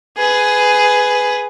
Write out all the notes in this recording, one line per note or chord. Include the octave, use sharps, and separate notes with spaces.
G#4 B4